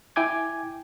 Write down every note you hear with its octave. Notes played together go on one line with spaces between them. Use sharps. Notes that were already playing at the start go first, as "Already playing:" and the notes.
E4 G5 G#5 D6 G#6